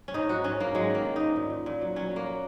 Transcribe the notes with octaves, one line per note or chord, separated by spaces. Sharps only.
C#4
G#2 D#4
G#2 F#4
G#2 C#4
G#2 A#3
F#3 G#3
D#3 A#3
D#3
G#2 D#4
A#2
A#2
A#2
F#3
F#3 C#4
F#3
A#3
F#3